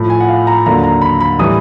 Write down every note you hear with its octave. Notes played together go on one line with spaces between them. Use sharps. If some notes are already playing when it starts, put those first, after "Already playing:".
Already playing: A2 F3
G#5
F#5
F5
A#5
D#2 D3 F#3 A#5
A#5
B5
B5
A2 E3 G3 D#6